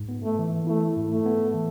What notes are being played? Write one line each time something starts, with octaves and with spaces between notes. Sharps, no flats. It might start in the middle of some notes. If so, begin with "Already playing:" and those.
Already playing: G#2
B3
A3
E3
A3 E4
G#2
A3
B3
E3